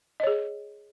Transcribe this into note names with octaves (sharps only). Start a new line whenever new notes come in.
G#4 C#5 D#5